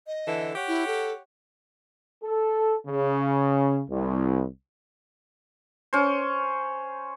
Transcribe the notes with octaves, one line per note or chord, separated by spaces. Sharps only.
D#5
D3 E3 A4
G4 C#5 F#5
E4
A4
A4
C#3
C2
C#4 C5